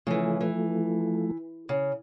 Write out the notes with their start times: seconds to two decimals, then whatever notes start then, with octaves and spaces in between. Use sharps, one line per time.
0.07 C#3 E3 F3 A3
0.41 E3
1.69 C#3